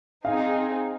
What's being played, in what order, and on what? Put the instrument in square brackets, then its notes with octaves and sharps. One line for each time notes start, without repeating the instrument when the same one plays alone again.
[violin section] C4 D#4 G#4 [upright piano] F5